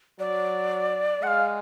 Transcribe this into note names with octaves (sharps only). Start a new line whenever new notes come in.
F#3 D5
G#3 F5 F#5